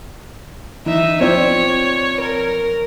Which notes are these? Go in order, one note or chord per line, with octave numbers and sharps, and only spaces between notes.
E3 D#4 E5
F3 C4 C#5 D5
A#4